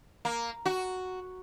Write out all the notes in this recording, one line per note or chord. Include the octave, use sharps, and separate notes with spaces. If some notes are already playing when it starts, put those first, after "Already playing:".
A#3
F#4